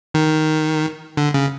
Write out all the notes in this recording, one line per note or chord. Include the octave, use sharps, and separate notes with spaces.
D#3
D3
C#3